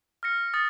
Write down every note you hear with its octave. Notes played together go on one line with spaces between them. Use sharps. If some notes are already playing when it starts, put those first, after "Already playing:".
F6 A#6 C#7
D#6 A6 C#7